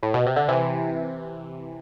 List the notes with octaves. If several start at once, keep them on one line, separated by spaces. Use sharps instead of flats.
A2
B2
C3
D3
C3 E3